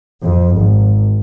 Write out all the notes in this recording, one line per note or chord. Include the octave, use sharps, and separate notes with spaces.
F2
G#1